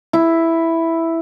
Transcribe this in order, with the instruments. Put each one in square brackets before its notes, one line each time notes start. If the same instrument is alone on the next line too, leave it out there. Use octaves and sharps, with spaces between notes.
[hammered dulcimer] E4